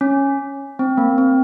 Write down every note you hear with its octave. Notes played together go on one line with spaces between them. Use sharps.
C#4
C4
A#3
C4